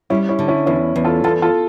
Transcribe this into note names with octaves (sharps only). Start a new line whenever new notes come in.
G3 C#4 E4
C#4 E4
D3
C#4 E4
E2 C#4 E4
E2
F4 A4
E2 F4 A4
F4 A4